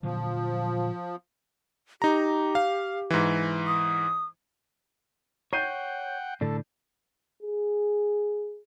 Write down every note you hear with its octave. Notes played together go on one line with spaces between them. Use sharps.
A#2 D3 F3 F#3
D#4 G4 A#5
F5
G#2 E3
D#6
C#5 F#5 G5 G6 C7 D#7
A2 D3 D4 A4
G#4